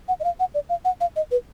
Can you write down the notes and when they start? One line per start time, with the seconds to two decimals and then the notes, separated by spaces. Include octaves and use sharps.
0.08 F#5
0.20 D#5
0.24 F5
0.40 F#5
0.54 D5
0.69 F5
0.85 F#5
1.01 F5
1.16 D#5
1.31 B4